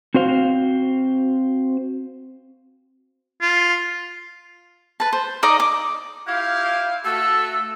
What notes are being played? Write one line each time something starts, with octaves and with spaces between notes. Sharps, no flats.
C4 F#4 C5 F5
F4
B4 A5
C5
D#4 D5 D#5 A#5
D6
E4 F4 G4 F5 G#6
A3 F#4 A4 E6